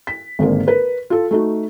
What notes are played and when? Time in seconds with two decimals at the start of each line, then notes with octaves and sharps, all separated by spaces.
0.07 B6
0.39 G#1 D3 G#3 A#3 G#4
0.67 A#4 B4
1.10 F4 A4
1.31 A3 D#4 F#4